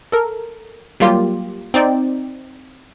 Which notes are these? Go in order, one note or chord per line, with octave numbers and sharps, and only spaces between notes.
A4 A#4
F#3 G3 A#3 F4 G4
C4 D#4 D5 G5